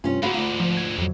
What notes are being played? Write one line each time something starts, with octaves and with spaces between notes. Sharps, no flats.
G2 C3 C#4 F4 G#5
G#2 D3 F#4 C5 F5 F#5 A#5 B5
D2 F4
F3
G#6
F2 F#3